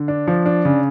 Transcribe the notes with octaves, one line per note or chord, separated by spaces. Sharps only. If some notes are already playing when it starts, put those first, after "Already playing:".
Already playing: D3
D4
F3
D4
C#3